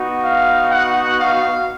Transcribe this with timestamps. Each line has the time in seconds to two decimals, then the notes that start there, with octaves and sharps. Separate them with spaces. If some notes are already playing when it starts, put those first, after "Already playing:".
Already playing: B3 D#4 F#4
0.23 F5
0.71 F#5
1.20 F5